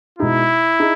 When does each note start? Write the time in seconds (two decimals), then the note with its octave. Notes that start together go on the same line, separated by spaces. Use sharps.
0.19 B2 G#3 D#4 E4 G#4
0.80 D#4 G#4